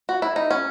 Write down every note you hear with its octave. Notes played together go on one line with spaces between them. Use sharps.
F#4
E4
D#4
C#4